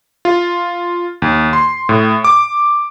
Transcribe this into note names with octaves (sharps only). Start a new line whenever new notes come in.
F4
D#2
C6
A2
D6